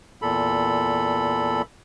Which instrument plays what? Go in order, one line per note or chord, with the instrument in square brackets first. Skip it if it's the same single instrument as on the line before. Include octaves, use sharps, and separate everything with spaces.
[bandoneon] E2 A#2 A4 B5